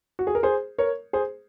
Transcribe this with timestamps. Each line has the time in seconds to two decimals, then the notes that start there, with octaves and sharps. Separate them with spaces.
0.19 F#4
0.27 G#4
0.35 A#4
0.43 G#4 C5
0.78 A#4 C#5
1.13 G#4 C5